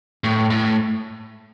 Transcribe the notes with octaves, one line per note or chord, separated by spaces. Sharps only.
A2
A2